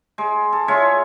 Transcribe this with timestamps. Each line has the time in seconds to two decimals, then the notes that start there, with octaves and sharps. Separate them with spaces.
0.18 G#3
0.52 A4
0.68 G#3 F4 C#5 E5